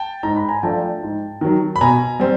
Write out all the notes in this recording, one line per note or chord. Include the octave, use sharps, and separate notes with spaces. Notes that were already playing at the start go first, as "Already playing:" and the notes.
Already playing: G5 A5
G#2 A#5
B5
G#5 A#5
F3 A3 D4 F4 G5 A5
G#2
D#3 F#3
B5
B2 G#5 A#5
G3 C4